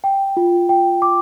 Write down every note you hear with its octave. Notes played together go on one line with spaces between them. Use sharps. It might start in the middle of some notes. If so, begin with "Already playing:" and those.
G5
F4
G5
D6